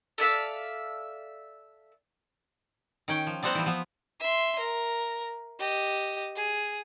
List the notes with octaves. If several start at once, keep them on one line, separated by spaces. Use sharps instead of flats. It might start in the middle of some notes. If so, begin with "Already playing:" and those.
A4 D5 E5 F5
D#3 C#4 G5
F3
G3 B3 C4 C5 F#5 A#5
E3 F3
F3 B3
E5 C6
A#4
G4 D#5
G#4